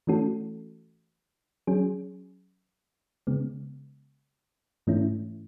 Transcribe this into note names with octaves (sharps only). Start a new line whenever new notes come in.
E3 A3 C#4 F#4 A4
F#3 C#4 G#4
C#3 G#3 B3
G#2 E3 A3 C#4 E4